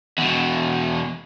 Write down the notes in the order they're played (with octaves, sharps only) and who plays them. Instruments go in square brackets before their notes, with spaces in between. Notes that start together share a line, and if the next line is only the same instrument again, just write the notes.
[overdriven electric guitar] E2 B2